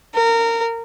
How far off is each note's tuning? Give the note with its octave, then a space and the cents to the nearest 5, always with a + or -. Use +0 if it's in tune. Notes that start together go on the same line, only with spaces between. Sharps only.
A#4 -20